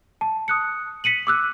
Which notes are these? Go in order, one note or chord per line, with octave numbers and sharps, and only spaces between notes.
A5
D#6 F#6 C#7
B6 C#7 D#7 F#7
D6 E6 F#6